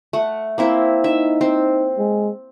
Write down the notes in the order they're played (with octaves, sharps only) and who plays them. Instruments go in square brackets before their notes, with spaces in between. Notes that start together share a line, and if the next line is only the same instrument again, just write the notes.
[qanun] A3 F#5
A#3 C4 E4
[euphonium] D#4 [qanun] E5
[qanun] C4
[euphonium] G#3